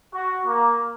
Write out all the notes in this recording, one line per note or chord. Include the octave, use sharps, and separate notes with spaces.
F#4
A#3